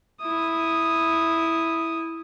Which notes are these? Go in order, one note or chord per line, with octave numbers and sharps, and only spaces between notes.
E4 D#6